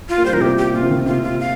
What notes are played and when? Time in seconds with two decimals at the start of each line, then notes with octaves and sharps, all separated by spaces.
0.09 F4
0.17 A#3
0.25 G3 C5
0.33 F3 A#4
0.41 C3 G4
0.58 G4
0.74 A#2 F4
0.82 C3
0.90 D#3
1.06 C3 F4
1.23 F4
1.40 F5